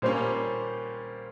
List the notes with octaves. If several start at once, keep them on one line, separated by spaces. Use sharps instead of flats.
A#2 G3 A#3 C#4 C5